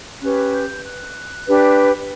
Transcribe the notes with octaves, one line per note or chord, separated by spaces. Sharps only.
C#4 G4 B4 F#6
G6
F#6
D4 G4 B4